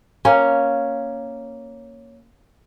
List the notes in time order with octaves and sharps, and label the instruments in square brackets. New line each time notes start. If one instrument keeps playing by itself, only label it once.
[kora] A#3 C#4